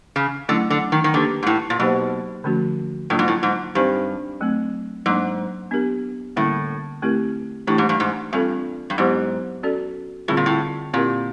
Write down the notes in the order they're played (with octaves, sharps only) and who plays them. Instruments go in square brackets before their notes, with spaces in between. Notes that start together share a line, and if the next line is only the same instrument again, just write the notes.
[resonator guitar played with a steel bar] C#3
[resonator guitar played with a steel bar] D3 [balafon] F#3 A3 C#4 E4
[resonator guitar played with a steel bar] D3
D#3
D#3
[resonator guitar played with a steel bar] D3 [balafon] A#3 D4 G4 B4
[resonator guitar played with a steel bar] G#2
A2
A#2
[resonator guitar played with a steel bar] B2 [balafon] F#3 A#3 D#4 G4 C5
[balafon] D3 F3 A3 C#4 F#4
[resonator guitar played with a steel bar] A2 [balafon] F#3 A#3 D4 F4
[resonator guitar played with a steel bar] G#2
A2
G#2
[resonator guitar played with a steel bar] G2 [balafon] C4 D#4 G4 C5
[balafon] F#3 A3 C4
[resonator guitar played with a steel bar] G#2 [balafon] F#3 A#3 D4
[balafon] B3 D4 G4 A#4
[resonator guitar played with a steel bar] A2 [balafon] D3 G3 A#3 C#4
[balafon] A3 C4 E4 G4 A#4
[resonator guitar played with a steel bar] A2 [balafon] E3 A3 D4 G4
[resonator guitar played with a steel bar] G#2
G2
G#2
[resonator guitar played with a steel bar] G2 [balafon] G3 C4 F4 A4
[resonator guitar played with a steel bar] G2
[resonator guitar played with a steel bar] G#2 [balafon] F#3 B3 E4 G4 C5
[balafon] C#4 F#4 A4 D5
[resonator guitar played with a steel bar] A2 [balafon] D3 G3 C4 F4 G#4
[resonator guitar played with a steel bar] A#2
A2
[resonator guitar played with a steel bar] A#2 [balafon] C4 E4 G4 A#4